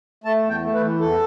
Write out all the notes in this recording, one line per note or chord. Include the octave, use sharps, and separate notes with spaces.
A3 A5
E2
G5
A3
B4
E3
E2 A4